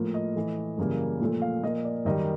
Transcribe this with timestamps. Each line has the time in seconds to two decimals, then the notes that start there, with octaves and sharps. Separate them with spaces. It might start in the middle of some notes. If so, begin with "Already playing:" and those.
Already playing: A2 F3 A#3
0.14 D#5
0.35 A2 E3 A3
0.78 F#2 C#3 E3 G3 A#3
1.20 A#2 F3 A3
1.42 F5
1.63 A#2 F3 A#3 D#5
1.85 D5
2.05 F#2 D#3 G3 D#5